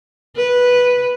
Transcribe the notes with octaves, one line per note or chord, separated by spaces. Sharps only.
B4